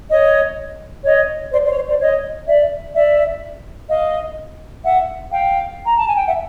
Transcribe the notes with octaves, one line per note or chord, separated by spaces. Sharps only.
C#5 D#5
C#5 D#5
C5 D5
C5 D5
C#5
C5
C5 D5
C#5 D#5
D5 E5
D5 E5
D#5 F5
E5 F#5
F5 G5
A#5
A5
G#5
G5
E5 F#5